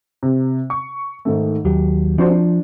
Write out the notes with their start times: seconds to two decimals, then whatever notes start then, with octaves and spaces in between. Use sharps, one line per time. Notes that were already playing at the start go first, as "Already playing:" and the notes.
0.23 C3
0.70 C#6
1.25 G#2 D#3 A3
1.65 D#2 F#3 G4
2.18 F3 D4 F#4 C5
2.30 D4